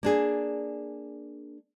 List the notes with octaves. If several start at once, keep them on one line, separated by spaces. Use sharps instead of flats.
A#3 D4 G#4